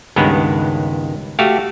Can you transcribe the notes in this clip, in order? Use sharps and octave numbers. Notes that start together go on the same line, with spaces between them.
C#2 G2 D#3 G#3 B3
A3 F#4 G4 F5